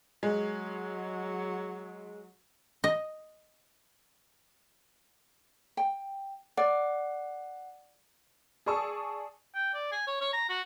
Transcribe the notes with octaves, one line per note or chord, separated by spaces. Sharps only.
F#3 G#3
D#5
G5
D5 F#5
G#4 D5 A5 C#6 D#6 E6
G5
D5
G#5
C#5
C#5
A#5
F#4